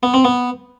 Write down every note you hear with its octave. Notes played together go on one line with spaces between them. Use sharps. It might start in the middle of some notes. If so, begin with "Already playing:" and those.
B3
C4
B3